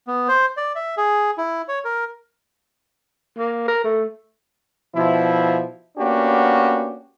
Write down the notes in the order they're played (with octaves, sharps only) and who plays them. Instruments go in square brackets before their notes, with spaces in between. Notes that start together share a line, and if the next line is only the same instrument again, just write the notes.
[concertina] B3
C5
D5
E5
G#4
E4
C#5
A#4
[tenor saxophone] A#3
A#4
A3
[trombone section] B2 F3 E4
A#3 B3 C#4 D4 F#4 G4